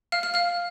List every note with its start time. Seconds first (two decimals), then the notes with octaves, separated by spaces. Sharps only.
0.12 F5 F6
0.23 F5 F6
0.34 F5 F6